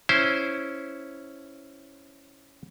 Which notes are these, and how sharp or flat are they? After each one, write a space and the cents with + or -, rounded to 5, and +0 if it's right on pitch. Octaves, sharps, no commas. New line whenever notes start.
C#4 +0 E4 +0 C5 +0